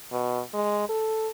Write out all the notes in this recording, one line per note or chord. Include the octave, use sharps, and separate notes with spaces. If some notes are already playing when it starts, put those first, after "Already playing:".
B2
G#3
A4